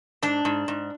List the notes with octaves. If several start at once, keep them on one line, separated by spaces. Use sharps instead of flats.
G#2 D4
G#2
G#2